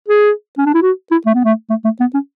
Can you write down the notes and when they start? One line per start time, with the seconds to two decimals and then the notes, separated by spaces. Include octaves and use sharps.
0.09 G#4
0.58 C#4
0.66 D4
0.74 E4
0.82 F#4
1.12 E4
1.26 A3
1.35 B3
1.44 A3
1.70 A3
1.85 A3
2.00 B3
2.14 C#4